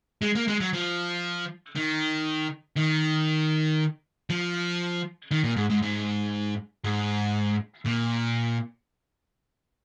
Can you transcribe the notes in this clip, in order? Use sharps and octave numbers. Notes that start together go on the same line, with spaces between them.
G#3
A#3
G#3
F#3
F3
D#3
D#3
F3
D#3
A#2
G#2
G#2
G#2
G#2
A#2